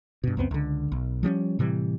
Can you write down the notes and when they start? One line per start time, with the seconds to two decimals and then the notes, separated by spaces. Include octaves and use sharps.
0.24 G2 B2
0.37 C#2 F#2 B3 C4
0.51 C#2 D3
0.92 B1
1.23 F3 G3 C4 C#4
1.59 A2 C3 E3 G3